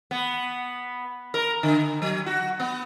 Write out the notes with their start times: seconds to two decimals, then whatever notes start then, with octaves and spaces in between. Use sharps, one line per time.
0.11 B3
1.34 A#4
1.63 D3
2.02 F#3
2.26 F#4
2.60 B3